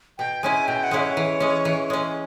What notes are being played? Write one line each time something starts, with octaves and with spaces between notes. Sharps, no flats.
B2 G5
G#3 C#4 E4 G#5
B2 G5
F#5
G#3 C#4 E4
C#5
E3
G#3 C#4
E3
G#3 C#4